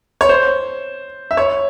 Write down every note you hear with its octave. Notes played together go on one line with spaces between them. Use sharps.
C#5
C5
E5
C#5